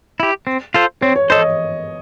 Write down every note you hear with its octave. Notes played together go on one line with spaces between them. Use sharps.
E4 G4
C4
F4 A4 C5
C4 C#5
C#5
A4 C5 C#5 D#5